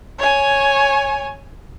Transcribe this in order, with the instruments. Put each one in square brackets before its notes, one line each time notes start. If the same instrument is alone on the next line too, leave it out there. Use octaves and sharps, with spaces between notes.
[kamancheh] C#5 G#5